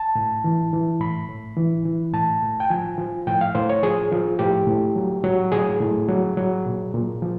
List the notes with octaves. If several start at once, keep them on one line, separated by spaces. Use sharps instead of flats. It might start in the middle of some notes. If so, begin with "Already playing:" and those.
Already playing: A5
A2
E3
E3
A2 B5
A2
E3
E3
A2 A5
A2
G5
F3 G#5
F3
A2 G5
F5
A2 C5
C#5
F3 G#4
F3
A2 G4
A2
F#3
F#3
A2 G#4
A2
F#3
F#3
A#2
A#2
F3